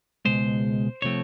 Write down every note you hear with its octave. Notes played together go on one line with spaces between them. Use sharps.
C#2 B2 G#3 C5
C3 F3 A3 C4 C#5